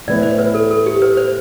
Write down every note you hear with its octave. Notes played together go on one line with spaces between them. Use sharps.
A2 E3 B3 E4 D5
C5
B4
A4
A4
G4
B4
C5